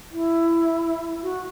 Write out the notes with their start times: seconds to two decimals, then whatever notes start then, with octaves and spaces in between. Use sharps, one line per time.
0.12 E4
1.23 F#4